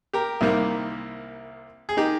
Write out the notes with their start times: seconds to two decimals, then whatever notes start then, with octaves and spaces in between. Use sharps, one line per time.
0.13 G4 A#4
0.41 C2 C3 D#3 G3 A#3
1.89 G#4
1.97 D#3 D#4 G4